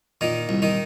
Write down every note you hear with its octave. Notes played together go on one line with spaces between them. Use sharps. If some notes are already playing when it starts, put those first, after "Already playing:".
A#2 D#3 D#4
C2
D#3 D#4